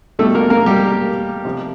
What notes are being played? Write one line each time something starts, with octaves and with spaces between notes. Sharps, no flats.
B2 G3 A3 A4
A#3 A#4
A#3 A#4
G3 G4
C3 F3